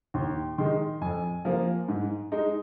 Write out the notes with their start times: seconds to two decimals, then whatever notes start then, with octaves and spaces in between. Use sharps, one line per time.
0.14 D#2 C6
0.58 D#3 G#3 D#4 C6
1.01 F2 G#5
1.45 F3 A#3
1.88 G#2
2.32 G#3 D#4